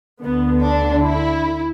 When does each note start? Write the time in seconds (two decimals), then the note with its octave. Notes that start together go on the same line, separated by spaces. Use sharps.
0.23 D2 D3 B3
0.64 D4
1.05 E4